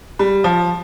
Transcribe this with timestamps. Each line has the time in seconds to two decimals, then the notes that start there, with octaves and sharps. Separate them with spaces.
0.19 G3
0.44 F3